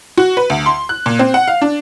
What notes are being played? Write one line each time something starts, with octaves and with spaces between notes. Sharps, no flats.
F#4
B4
D2
C6
F#6
A#2
C4
F#5
F5
D4